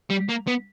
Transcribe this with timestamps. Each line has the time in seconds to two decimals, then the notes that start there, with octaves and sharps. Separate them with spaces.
0.10 G3
0.29 A#3
0.47 B3